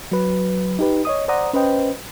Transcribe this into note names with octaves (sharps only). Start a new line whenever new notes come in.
F#3 B4
D#4 G4 B4
C#5 D#5 D#6
C5 D5 F#5 A#5 D#6
C#4 B4 C5 D#5 G5